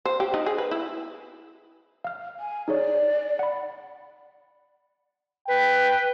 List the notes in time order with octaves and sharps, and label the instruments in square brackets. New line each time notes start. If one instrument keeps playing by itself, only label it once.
[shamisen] C5
G4
D#4
G#4
B4
E4
[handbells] F5 F6
[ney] G#5
[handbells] D#4 G#4 C#5 [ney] D5
[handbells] F#5 B5
[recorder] B4 [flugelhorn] G5